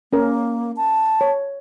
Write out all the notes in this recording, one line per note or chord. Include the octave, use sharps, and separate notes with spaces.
A#3 C#4 A#4
A5
C#5